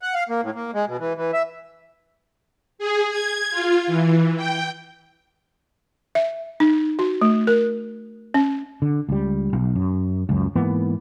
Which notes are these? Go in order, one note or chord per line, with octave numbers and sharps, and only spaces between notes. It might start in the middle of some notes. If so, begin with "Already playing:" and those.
F#5
F5
A#3
A2
A#3
G#3
B2
E3
E3
E5
G#4
G#6
F4
E3
G5
E5
D#4
F#4
A3
A#4
C#4
D3
C#2 G3
B1
F#2
C#2 F#2
G#2 E3 A#3 B3